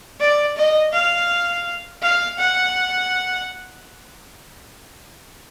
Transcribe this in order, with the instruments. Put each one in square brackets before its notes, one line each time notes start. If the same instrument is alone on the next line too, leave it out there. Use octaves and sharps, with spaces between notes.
[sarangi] D5
D#5
F5
F5
F#5